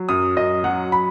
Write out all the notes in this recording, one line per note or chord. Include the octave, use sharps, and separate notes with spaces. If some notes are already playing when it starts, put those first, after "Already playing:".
Already playing: F#3
F#2 D#6
F#2 D#5
F#3 F#5
B5